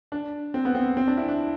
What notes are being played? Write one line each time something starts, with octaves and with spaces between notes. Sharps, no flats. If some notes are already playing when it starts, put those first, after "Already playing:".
D4
C4
B3
C4
C4
D4
E4
D4